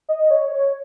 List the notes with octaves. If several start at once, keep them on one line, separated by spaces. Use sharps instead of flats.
D#5
C#5
C#5